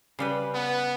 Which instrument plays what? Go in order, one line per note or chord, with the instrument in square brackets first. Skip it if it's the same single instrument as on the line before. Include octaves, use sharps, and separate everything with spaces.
[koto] C#3 G3 B4
[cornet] B3